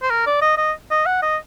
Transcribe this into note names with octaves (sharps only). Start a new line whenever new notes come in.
C5
A#4
D5
D#5
D#5
D#5
F#5
D#5